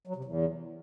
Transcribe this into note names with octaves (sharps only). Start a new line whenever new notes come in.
F#3
C3
E2